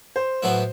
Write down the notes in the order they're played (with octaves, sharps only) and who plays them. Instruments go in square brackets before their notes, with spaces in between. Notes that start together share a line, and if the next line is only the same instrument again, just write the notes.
[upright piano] C5
[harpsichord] A2 F#3 B3 E4